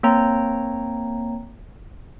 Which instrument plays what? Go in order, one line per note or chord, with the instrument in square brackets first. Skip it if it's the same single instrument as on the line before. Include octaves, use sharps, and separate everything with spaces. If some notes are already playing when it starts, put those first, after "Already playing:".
[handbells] A#3 C4 C#5 G5 A#5